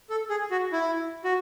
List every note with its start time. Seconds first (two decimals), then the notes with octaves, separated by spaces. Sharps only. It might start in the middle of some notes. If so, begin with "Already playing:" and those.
0.10 A4
0.30 G#4
0.51 F#4
0.72 E4
1.24 F#4